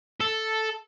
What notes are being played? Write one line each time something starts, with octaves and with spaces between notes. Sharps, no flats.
A4